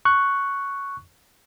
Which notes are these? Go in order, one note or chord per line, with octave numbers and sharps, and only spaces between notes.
C#6 F#6